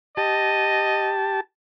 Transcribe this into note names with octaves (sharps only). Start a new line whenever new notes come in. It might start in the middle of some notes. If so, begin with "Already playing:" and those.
G4 D#5 A5